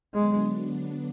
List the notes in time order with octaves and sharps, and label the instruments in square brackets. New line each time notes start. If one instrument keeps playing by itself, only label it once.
[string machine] D3 F#3 B3 D4 [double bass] G#3